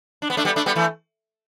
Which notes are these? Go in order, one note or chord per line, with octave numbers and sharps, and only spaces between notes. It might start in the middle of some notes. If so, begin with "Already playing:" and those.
D4
B3
A3 D4
G3 B3
A3 D4
G3 B3
E3 A3